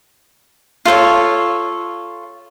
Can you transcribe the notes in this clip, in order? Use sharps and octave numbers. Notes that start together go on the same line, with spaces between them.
F4 A4 C5 C#5